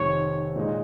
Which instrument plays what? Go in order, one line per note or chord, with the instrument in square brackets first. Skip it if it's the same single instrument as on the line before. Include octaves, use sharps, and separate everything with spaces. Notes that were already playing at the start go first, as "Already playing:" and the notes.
Already playing: [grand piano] F1 F2 D#3 [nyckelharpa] C#5
[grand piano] A#2 G#3 D#4